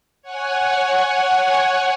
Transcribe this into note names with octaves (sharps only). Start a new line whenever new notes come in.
C#5 F#5 G#5